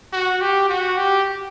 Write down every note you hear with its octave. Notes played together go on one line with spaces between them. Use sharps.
F#4
G4
F#4
G4